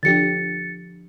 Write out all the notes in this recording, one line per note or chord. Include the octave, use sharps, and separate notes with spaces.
D3 F3 G4 A6 C#7